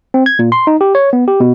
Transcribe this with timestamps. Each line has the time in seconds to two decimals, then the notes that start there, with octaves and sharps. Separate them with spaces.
0.14 C4
0.26 G#6
0.39 A#2
0.52 C6
0.67 D#4
0.81 G4
0.95 C#5
1.13 B3
1.28 G4
1.40 B2